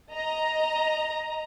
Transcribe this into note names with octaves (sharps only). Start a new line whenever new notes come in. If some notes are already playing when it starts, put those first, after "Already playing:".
D#5 A#5